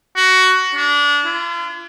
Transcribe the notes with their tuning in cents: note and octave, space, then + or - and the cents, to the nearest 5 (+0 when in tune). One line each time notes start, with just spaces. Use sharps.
F#4 +15
D4 -25
F4 -45